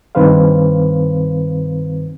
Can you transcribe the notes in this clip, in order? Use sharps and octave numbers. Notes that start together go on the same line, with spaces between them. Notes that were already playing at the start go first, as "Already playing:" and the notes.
G2 D#3 C4 B4 C5 F5